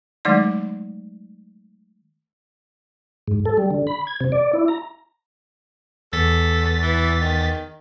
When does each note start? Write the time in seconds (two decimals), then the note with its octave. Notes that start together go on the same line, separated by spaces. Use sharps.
0.25 D#3 F#3 G#3 A3 D#4 D5
3.28 G#2
3.45 A4
3.57 G3
3.71 D3
3.87 B5
4.07 G#6
4.20 C3
4.32 D5
4.53 E4
4.68 A#5
6.13 E2 A4 A6 B6
6.82 E3
7.21 D#3